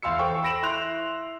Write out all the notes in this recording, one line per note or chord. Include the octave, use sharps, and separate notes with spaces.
E2 F5 C6 E6 C#7
A4 C5 G5 C#6
B5 E6 A#6 D7 E7 F#7
E4 C6 F#6 F7